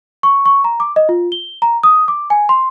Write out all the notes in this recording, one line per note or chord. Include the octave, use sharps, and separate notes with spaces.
C#6
C#6
A#5
D6
D#5
F4
G7
A#5
D#6
D6
G#5
C6